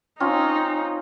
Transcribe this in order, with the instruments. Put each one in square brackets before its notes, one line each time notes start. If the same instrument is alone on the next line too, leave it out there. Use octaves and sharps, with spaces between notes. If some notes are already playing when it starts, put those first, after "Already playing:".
[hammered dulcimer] C4 C#4 F4 [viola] D#4